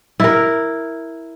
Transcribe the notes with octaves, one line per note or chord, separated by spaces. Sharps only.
E4 A#4